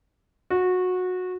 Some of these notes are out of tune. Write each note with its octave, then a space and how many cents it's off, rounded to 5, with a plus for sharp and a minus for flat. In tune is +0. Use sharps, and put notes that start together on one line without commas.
F#4 -20